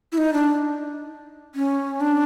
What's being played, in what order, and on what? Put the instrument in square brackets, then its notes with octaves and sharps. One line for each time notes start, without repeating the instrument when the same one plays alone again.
[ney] E4
D#4
D4
C#4
D4